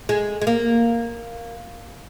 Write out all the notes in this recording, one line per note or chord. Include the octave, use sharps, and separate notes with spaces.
G#3
G#3
A#3